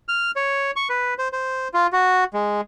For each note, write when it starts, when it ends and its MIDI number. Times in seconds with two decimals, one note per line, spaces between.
0.08 0.31 89
0.36 0.71 73
0.76 0.88 85
0.89 1.14 71
1.18 1.28 72
1.33 1.68 72
1.74 1.87 65
1.93 2.24 66
2.34 2.61 56